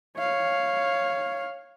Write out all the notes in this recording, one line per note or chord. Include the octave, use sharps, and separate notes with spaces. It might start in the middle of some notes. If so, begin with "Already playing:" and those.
C#5 F5